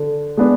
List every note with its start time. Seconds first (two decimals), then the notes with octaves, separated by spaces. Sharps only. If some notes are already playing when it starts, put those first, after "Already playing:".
Already playing: D3
0.37 G#3 B3 D4